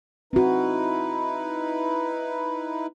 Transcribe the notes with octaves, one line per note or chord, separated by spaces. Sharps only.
C4 D#4 E4 F#4 B4